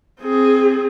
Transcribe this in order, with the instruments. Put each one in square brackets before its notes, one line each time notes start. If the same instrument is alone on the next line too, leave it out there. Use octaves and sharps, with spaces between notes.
[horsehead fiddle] C4 G#4